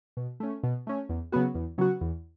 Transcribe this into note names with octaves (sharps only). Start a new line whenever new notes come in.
B2
A3 C#4
B2
A3 C#4
E2
C#3 F#3 B3 F#4
E2
C#3 F#3 B3 F#4
E2